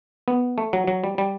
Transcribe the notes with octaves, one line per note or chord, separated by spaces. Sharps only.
B3
A3
F#3
F#3
G3
G3